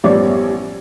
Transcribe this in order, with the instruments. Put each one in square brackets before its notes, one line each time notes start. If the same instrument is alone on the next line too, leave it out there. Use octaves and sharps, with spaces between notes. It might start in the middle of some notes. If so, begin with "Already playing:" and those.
[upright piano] A1 F3 G3 B3 C#5 D5